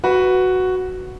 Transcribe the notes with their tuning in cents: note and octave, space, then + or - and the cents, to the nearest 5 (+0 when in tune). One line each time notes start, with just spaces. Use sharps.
F#4 +0 B4 +0